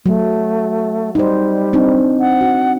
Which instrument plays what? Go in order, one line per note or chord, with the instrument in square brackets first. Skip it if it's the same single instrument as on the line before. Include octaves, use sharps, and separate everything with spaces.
[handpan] F#3 [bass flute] A3
[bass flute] G3 [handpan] D#4 C5
[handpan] C4 D4 D#4
[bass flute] F#5
[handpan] F#4